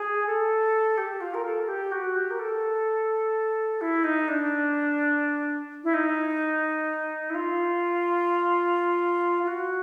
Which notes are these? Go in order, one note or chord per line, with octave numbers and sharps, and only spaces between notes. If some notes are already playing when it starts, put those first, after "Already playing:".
Already playing: G#4
A4
G4
F4
A#4
A4
G4
F#4
G4
A#4
A4
E4
D#4
D4
E4
D#4
E4
F4
F4
F#4